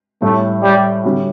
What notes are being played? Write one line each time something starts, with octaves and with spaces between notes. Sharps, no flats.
A2 G3 A3 C#4
G3
D3 G3 C#4 F#4